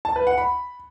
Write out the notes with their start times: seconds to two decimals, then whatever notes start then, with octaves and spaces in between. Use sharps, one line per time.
0.05 A5
0.16 B4
0.27 F#5
0.38 B5